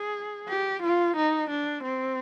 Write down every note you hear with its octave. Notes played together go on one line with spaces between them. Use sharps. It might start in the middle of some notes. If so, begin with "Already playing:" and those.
Already playing: G#4
G4
F4
D#4
D4
C4